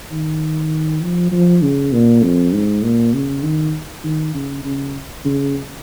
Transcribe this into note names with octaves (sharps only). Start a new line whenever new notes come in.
D#3
F3
F3
C#3
A#2
F2
G#2
A#2
C#3
D#3
D#3
C#3
C#3
C#3